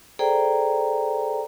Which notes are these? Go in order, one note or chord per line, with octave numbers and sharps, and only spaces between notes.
G#4 A4 C5 D5 G5 A#5